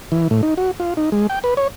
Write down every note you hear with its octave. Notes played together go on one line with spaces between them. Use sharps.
E3
A2
D#4
F#4
F4
D#4
G#3
G5
B4
C#5